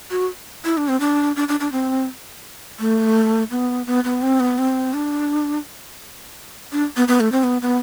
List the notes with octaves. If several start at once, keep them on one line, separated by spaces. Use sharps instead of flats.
F#4
E4
D4
C4
D4
D4
D4
D4
C4
A3
B3
B3
B3
C4
B3
C4
D4
D4
B3
B3
A3
C4
B3
B3